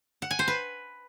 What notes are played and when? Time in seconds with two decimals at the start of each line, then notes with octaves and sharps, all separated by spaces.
0.22 F#5
0.31 G#5
0.39 C5
0.48 B4